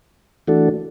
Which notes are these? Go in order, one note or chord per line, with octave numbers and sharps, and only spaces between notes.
E3 A3 D4 F#4 A4